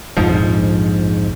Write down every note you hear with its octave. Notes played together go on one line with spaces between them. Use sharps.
A#1 F2 G#2 F3